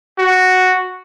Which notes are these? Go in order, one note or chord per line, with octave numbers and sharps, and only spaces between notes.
F#4